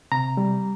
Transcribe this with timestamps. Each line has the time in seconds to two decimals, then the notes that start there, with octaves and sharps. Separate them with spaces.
0.12 C3 A#5
0.37 G3